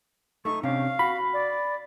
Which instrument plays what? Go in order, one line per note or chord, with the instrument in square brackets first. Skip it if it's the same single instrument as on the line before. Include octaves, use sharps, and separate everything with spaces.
[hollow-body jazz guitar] A3 D#4 [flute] C#6
[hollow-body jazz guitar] C3 C#4 D4 [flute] F5
[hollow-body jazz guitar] F#4 [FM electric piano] B5
[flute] D5